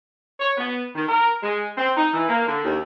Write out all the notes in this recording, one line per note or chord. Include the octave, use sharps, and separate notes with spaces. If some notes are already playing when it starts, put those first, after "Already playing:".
C#5
B3
D#3
A#4
G#3
C4
D#4
E3
A#3
D3
D#2